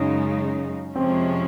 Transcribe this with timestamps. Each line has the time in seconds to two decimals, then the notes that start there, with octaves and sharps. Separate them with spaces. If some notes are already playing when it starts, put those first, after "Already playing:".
Already playing: F#2 C#3 G#3 C#4 D#4
0.95 F2 C3 F3 G#3 C4 C#4